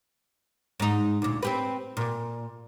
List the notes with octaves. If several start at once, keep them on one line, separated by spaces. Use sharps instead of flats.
G#2 D#4
D2 A#2
C4 G4 B4
A#2